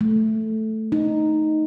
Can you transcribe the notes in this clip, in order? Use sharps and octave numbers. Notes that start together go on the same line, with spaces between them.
A3
D#4